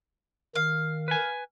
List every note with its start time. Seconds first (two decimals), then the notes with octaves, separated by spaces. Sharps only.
0.56 D#3 F5
1.08 B4 G#5